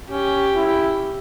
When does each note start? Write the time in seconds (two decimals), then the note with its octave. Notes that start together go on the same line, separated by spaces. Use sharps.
0.10 C#4 G4
0.55 E4